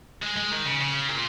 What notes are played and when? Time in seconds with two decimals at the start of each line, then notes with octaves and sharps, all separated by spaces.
0.23 G#3
0.37 G#3
0.52 D#3
0.66 C#3
0.81 C#3
1.09 A#2